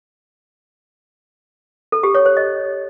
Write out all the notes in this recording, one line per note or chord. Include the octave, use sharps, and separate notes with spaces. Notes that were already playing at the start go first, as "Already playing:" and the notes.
A4
G4
C#5
C5
D#5